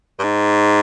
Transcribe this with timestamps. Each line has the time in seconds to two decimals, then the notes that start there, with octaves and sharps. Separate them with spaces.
0.19 G2
0.24 G#2